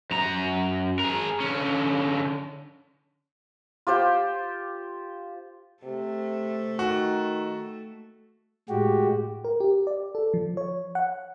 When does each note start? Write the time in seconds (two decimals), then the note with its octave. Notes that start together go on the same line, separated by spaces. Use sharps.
0.11 F#2 A#5
0.99 G#4 A#4
1.40 D3 C#4
3.87 F4 G4 C5 G5
5.84 C3 A3 A4
6.79 D#3 F#4
8.69 A2 G#3 F#4 G4
9.45 A#4
9.60 G4
9.87 D5
10.15 A4
10.34 F3
10.57 C#5
10.95 F#5